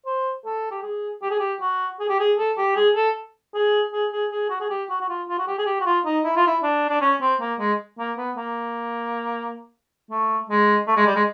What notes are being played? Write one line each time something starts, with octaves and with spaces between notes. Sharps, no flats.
C5
A4
G4
G#4
G4
G#4
G4
F#4
G#4
G4
G#4
A4
G4
G#4
A4
G#4
G#4
G#4
G#4
F#4
G#4
G4
F#4
F#4
F4
F4
F#4
G4
G#4
G4
F#4
F4
D#4
E4
F4
E4
D4
D4
C#4
C4
A#3
G#3
A#3
B3
A#3
A3
G#3
A3
G#3
G3
G#3